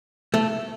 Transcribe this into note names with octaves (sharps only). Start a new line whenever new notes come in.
A3